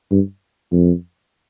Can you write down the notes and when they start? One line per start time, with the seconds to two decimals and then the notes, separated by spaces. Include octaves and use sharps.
0.11 G2
0.72 F2